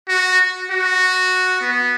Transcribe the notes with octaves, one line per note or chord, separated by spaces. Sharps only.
F#4
F#4
B3